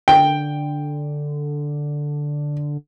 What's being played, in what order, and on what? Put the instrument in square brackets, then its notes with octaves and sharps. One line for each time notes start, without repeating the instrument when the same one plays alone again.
[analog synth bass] D3 [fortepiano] G5